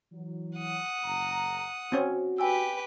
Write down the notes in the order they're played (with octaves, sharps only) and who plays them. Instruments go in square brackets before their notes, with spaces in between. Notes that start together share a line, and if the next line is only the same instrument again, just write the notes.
[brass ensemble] E3 F#3
[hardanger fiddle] F#5 D#6
[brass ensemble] F#1 A#5
[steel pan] C4 C#4 [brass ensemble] F#4
[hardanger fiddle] G4 B4 [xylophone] G5 G#5 E6